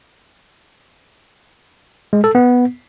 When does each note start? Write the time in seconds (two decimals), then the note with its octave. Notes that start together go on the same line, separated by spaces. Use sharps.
2.13 G#3
2.24 A4
2.35 B3